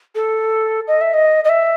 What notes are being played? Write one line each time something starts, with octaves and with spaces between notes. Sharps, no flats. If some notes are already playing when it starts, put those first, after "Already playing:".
A4
D#5
E5
D#5
D#5
E5